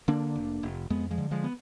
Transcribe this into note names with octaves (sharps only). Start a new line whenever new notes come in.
D3 A#3 D4
F1
F1
F2 G#3 B3
F3 G#3
D3
F3 G#3
B3